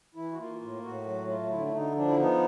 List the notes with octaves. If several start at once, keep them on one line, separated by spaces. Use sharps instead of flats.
E3 E4
F#4
A#3 F4
A2
A2 F#4
F#3
A3 F4
D3 E4
E4
D3 D#4
F3 D4
E4
B3 D#4